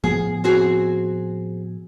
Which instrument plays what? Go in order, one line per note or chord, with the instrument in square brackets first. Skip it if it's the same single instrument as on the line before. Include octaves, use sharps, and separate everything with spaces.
[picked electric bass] A2 F3 B3 [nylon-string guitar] G#4
[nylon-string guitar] C4 F#4 G#4